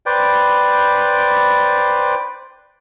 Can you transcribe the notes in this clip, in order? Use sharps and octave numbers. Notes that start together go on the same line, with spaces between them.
B4 C5 D5 G5